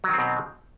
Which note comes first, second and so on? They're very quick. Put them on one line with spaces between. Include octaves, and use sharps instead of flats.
F#3 D#3 C4 B2